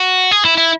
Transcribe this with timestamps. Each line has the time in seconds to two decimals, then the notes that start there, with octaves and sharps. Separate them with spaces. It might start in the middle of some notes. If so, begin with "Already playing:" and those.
Already playing: F#4
0.31 G#4
0.45 E4
0.57 E4